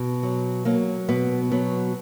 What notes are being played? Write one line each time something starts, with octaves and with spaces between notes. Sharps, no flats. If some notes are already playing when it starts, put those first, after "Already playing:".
Already playing: B2
F#3
F#3 A#3
B2 B3
F#3 B3